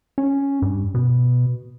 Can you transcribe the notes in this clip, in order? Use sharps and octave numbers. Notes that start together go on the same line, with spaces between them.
C#4
G2
B2